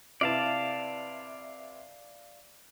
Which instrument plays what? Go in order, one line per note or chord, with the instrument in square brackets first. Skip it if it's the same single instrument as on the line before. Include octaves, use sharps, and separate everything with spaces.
[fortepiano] C3 E4 B4 [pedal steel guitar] D5 F5 A5